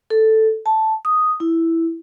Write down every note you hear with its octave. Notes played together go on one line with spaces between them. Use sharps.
A4
A5
D#6
E4